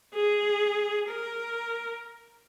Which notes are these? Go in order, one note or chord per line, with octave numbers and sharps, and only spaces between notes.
G#4
A#4